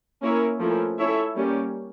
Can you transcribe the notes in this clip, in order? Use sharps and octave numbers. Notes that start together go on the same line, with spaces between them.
A#3 C#4 E4 A#4 C#5
F3 A3 C#4 E4 A#4
C#4 E4 A4 C#5 E5
G3 A#3 C#4 G4